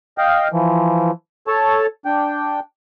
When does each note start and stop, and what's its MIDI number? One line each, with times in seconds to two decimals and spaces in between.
0.18 0.48 75
0.18 0.48 77
0.18 0.48 79
0.52 1.11 52
0.52 1.11 53
1.47 1.86 69
1.47 1.86 73
1.47 1.86 81
2.05 2.60 62
2.05 2.60 79